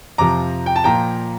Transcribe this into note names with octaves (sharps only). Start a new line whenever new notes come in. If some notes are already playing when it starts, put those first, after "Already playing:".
F2 C3 F3 A#5 D6
G5
A5
A#2 F3 G5 A#5